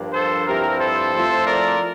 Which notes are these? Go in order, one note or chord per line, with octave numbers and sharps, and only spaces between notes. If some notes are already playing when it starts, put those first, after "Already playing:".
Already playing: G2 F3 A#3 D4
A4 C5
G2 F3 C4 E4 G4 A#4
A4 C5
F3 A3 C4 E4
A#4 D5